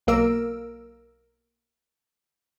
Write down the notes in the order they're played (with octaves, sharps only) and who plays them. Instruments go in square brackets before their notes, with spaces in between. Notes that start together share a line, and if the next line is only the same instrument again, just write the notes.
[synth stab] B1 A#3 A#4 E6 D7